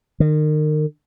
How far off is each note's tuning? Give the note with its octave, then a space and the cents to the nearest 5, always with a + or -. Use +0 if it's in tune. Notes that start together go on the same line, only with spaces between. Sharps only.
D#3 -30